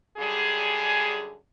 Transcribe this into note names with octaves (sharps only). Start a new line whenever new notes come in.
F#2 D3 G3 G#4